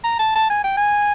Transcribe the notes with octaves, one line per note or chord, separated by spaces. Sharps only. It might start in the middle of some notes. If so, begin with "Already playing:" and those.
A#5
A5
A5
G#5
G5
G#5